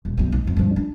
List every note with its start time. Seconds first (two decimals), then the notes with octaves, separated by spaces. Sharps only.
0.05 D#1
0.17 B1 F#3
0.32 D#4
0.45 B1 F2
0.57 G2 F3
0.76 D4